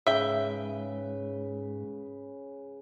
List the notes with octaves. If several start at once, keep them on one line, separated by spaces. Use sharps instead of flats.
G#2 C#3 B4 E5 G5